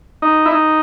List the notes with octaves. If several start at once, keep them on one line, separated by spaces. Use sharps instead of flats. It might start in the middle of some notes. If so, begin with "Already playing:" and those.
D#4
E4
D#4